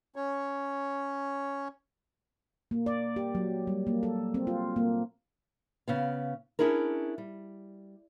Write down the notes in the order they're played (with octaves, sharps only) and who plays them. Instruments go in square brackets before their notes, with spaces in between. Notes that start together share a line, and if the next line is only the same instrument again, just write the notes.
[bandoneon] C#4 C#5
[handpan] A#3
D5
G4
F#3
G3
A#3
A4
C4
F4
A#3
[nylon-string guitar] C#3 B3 F5
C#4 D4 E4 G#4 A#4
G3